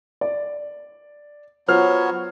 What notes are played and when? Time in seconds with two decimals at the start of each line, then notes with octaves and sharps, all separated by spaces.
0.21 D5
1.68 F#3 B3 F4 C5 C#5 F6